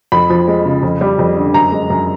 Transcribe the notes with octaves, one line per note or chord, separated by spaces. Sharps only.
F2 B5
F3
G#3
C#3
F2
G3
F2
D3
F#2 A#5
G#3
F#2